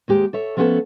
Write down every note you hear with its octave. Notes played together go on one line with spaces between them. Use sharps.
D#2 G#3 G4 C5
A4 C#5 E5
F3 A3 B3 C#4 F#4 A4